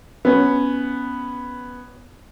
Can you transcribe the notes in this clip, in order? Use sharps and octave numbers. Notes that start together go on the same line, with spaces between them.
B3 C#4